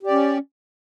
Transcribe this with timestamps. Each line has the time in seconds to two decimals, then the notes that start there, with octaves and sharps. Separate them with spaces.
0.03 G4
0.07 D5
0.11 C#4